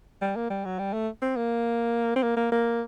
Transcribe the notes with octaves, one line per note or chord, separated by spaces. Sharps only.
G3
A#3
G3
F#3
G3
A3
C4
A#3
C4
A#3
A#3
A#3